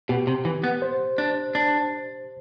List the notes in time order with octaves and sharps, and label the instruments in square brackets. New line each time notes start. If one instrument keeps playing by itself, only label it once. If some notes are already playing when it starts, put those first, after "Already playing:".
[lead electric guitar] B2 [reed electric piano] G4
[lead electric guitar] C3
E3
B3
[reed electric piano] C5
[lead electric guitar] D4
D4